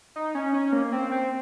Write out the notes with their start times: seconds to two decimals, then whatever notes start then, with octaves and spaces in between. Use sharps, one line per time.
0.16 D#4
0.35 C#4
0.54 C#4
0.73 A#3
0.92 C4
1.11 C4